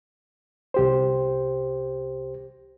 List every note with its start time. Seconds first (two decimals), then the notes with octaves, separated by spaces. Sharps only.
0.74 C2 G4 C5